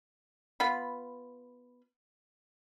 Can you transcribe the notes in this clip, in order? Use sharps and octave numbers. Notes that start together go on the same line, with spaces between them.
B3 F4 B5